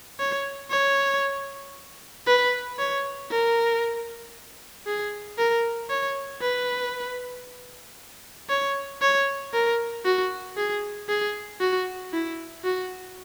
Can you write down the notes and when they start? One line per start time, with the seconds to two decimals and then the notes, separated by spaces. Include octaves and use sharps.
0.19 C#5
0.71 C#5
2.27 B4
2.78 C#5
3.31 A#4
4.86 G#4
5.38 A#4
5.90 C#5
6.41 B4
8.49 C#5
9.01 C#5
9.53 A#4
10.05 F#4
10.57 G#4
11.09 G#4
11.61 F#4
12.12 E4
12.64 F#4